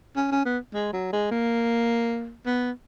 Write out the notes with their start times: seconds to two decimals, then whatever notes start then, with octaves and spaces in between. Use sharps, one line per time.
0.16 C#4
0.31 C#4
0.45 B3
0.74 G#3
0.93 F#3
1.13 G#3
1.31 A#3
2.46 B3